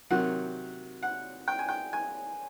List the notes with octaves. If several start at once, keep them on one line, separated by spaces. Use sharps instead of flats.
C3 D#3 F#3 F#5
F#5
G5
G#5
G5
G#5